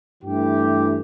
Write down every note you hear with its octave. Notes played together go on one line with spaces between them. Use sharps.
G2 E3 A3 G4